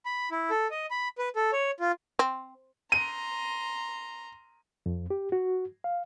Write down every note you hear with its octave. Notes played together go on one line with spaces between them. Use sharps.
B5
E4
A4
D#5
B5
B4
A4
C#5
F4
C4
A#5 C6 D#7
F2
G4
F#4
F5